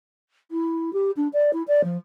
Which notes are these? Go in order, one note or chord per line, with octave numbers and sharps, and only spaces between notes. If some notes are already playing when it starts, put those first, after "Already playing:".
E4
G4
D4
D5
E4
D5
F3